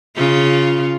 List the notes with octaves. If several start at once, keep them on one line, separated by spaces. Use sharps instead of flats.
C#3 F4